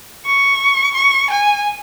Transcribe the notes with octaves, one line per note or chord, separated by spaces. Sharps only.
C#6
C#6
G#5